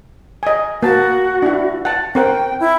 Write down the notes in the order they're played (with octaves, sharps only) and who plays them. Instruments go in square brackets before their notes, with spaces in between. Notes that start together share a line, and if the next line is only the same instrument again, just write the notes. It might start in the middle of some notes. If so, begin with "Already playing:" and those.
[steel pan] D#5 G#5
[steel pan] A#3 A5 [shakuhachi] F#4
[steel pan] D4 E4
F#5 A5
[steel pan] C4 A#4 F#5 [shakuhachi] G5
[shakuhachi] E4